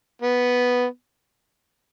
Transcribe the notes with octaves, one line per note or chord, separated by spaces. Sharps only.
B3